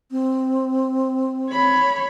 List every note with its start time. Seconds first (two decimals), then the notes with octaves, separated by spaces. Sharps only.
0.11 C4
1.50 C#5 B5